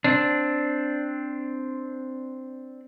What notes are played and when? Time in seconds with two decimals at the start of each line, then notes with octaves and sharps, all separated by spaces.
0.04 C4 D4